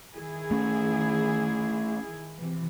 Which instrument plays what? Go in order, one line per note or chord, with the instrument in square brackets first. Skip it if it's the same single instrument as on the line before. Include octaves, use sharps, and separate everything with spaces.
[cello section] D#3 E4 G#4
[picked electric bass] A3 C#4
[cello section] C3 E3